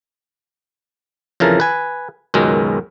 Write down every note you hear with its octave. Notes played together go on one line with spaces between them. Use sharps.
F2 C#3 E3 A#4 A5
B4 G#5
C#2 F#2 B2 D#3 G#3